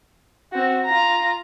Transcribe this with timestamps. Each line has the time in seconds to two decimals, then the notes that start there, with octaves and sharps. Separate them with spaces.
0.52 C4 F#4
0.86 F4 A#5